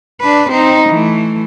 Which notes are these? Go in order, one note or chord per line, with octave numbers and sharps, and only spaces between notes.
D4 B4
C4 D#4
E3 A3